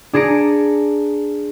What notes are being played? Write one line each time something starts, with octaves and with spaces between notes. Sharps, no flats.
D4 G#4 A#5 C#7 D7